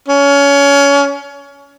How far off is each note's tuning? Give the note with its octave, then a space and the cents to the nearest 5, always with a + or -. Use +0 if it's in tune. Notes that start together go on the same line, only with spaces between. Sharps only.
C#4 +25